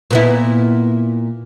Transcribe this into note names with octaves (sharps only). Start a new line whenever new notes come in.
A#2 B3 E4